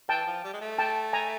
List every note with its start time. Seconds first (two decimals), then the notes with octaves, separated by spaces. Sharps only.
0.09 E3 G5 A5
0.26 F3
0.44 G3
0.53 G#3
0.61 A3
0.78 G5 A5
1.13 G#5 A#5